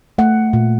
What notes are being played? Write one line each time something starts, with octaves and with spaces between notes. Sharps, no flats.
A3 F#5
A#2